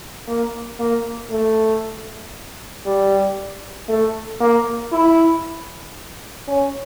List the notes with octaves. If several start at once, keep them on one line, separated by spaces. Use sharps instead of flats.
A#3
A#3
A3
G3
A3
A#3
E4
C#4